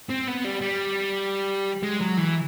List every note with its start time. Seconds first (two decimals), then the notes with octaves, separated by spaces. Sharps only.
0.09 C4
0.27 B3
0.44 G3
0.61 G3
1.83 G#3
2.00 F#3
2.17 E3